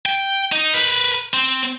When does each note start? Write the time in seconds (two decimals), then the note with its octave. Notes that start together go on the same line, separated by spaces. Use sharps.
0.06 G5
0.52 D#4
0.74 A#4 B4
1.34 C4